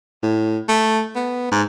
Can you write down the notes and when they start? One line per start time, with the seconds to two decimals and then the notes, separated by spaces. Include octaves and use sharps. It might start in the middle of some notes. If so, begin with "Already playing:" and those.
0.23 A2
0.68 A3
1.15 B3
1.52 G#2